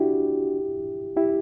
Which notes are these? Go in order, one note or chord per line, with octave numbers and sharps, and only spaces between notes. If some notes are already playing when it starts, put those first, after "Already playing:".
Already playing: D4 E4 F#4 G4
E4 G4